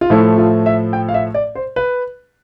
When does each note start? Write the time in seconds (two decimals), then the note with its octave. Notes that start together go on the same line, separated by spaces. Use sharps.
0.01 F4
0.10 A2 F3 A3 E4
0.38 F4
0.66 E5
0.93 G5
1.09 F5
1.14 E5
1.34 D5
1.55 C5
1.76 B4